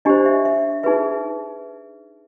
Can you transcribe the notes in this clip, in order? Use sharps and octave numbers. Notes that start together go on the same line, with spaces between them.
D4 G4 C5 D#5
E5
E5
D#4 G#4 B4 E5